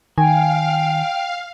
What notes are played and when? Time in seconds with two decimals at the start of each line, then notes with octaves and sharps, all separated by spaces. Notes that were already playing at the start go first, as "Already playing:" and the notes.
0.18 D#3 F5 G5 G#5